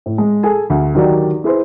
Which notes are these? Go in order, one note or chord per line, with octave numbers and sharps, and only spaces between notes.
A2
G#3
G#4 A4 G#5
D2
D#3 F#3 F#4 G4 D5
E4 G#4 B4 C5